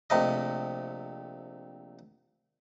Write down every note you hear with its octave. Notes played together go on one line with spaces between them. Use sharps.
A#1 C3 A3 D#5